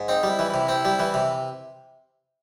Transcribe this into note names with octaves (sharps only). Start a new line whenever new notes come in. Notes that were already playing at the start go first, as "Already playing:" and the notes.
Already playing: G#2
C4 D#4
G3
E4
E3
C3 E4
C4
G3
E3
C3